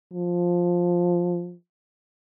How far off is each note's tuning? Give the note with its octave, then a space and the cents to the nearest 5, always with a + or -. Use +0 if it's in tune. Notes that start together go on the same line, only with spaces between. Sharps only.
F3 +5